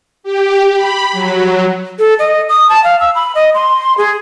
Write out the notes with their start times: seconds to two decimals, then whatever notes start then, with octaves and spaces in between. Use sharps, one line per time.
0.23 G4
0.73 B5
1.12 F#3
1.99 A4
2.19 D#5
2.49 D#6
2.69 A5
2.84 F5
3.00 E6
3.15 B5
3.35 D#5
3.54 C6
3.98 G#4